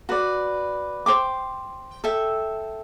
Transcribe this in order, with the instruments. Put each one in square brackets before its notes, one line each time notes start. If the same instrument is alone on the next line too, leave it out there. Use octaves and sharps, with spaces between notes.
[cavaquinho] F#4 B4 D5
C5 G5 D6
A4 E5 G5